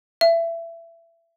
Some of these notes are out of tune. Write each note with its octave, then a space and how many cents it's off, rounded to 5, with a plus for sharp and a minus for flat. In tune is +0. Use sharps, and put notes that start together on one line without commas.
E5 +25